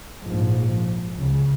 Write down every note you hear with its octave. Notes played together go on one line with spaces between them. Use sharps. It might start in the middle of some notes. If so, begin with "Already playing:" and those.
A#1 G#2 F3
C#2 C#3